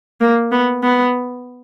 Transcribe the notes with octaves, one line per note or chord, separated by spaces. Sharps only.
A#3
B3
B3